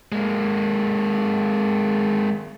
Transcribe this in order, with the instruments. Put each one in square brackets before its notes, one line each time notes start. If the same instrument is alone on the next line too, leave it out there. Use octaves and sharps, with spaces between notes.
[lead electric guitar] G#3 A#3